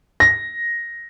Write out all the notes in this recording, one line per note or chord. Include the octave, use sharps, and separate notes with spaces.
A#6